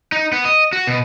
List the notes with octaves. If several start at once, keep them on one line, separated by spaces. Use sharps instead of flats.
D#4
B3
D#5
F#4
B2